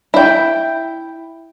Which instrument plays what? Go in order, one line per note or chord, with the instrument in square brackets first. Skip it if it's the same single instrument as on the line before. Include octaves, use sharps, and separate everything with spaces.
[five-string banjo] E4 G5